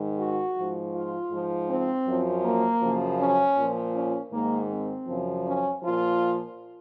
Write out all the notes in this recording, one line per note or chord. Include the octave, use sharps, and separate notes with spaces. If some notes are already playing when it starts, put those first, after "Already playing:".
Already playing: G#2 D#3
F#4
G#2 F3
F4
G#2 F3
C4
F#2 F3
A#3
F#2 C#3 F3
C#4
A#2 F3
C#4
G#2 D#3 A#3
C4
F#2 C#3 F3
C#4
A#2 F3 F4